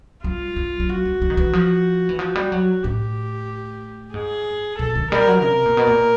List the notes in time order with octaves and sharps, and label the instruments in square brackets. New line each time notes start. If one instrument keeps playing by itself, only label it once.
[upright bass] G3 [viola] F4
[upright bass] G3
G3
[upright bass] F#3 [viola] F#4
[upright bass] G3
G3
D#3
E3
F3
E3
[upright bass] F3 [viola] F#4
[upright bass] G3
F#3
[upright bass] A2 [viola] G4
[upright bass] G#2 [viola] G#4
[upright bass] B2 [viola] A4
[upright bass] D#3
[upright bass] G3 [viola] A#4
[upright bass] F#3
[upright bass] C3 [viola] A#4
[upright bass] A#2
B2
A#2